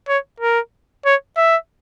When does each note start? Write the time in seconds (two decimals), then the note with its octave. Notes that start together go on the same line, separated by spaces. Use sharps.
0.08 C#5
0.40 A#4
1.05 C#5
1.37 E5